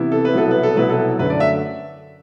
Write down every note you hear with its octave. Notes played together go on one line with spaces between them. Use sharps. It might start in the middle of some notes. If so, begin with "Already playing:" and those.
Already playing: C3 E3 B3 E4
A4
B4
C2 B2 F#3 B3 E4 A4
B4
A4
C2 B2 F#3 B3 E4 B4
A4
F#2 D3 A3 B4
D5
E5